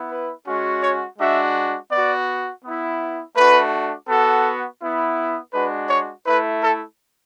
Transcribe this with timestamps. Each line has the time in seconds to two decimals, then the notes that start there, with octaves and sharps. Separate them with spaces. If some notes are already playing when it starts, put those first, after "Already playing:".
Already playing: B3 E4
0.10 B4
0.46 G#3 C#4 F#4
0.83 C#5
1.19 G#3 D4 F#4 E5
1.91 B3 F#4 D5
2.64 B3 E4
3.36 A3 D4 F#4 B4
4.08 B3 F#4 A4
4.81 B3 E4
5.53 G#3 D4 F#4 B4
5.89 C#5
6.25 A3 E4 B4
6.61 A4